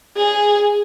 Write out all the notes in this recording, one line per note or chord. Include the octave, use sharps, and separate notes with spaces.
G#4